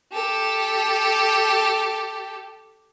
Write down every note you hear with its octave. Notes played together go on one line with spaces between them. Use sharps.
G4 A4